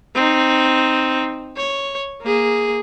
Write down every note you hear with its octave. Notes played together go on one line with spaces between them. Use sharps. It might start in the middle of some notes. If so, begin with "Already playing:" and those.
C4 D#4
C#5
A#3 G#4